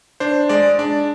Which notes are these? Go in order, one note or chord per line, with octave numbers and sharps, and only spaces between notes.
D4 C5
G#3 D5
D4 D5